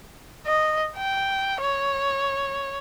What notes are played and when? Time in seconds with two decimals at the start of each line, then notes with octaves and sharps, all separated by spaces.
0.46 D#5
0.96 G5
1.61 C#5